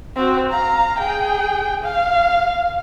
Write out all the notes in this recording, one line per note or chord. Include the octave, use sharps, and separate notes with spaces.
C4 F#4
F5 A#5
G#4 G5
F5